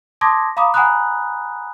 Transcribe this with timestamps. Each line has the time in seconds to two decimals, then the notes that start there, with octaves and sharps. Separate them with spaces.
0.21 A5 C6 D6 D#6 G#6 A#6
0.57 F5 A#5 B5 D6 D#6
0.74 F#5 G#5 A#5 B5 D#6 F#6